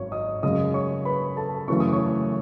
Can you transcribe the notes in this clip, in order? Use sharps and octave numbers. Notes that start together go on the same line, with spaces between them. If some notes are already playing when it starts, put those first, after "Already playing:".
Already playing: G#1 F#2 C#5 C#6
D#5 D#6
F#2 C#3 G#3 D#5 D#6
C#5 C#6
B4 B5
A4 A5
F#2 C#3 E3 A3 C#6
D#6
C#5 C#6